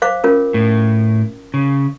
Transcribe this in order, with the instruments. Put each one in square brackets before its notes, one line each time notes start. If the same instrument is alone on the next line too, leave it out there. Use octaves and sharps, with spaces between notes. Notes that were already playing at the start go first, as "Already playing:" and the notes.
[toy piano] C5 F5 D6
C#4 F4 A#4
[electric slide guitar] A2
C#3